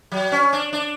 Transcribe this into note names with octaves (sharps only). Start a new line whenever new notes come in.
F#3
C#4
D4
D4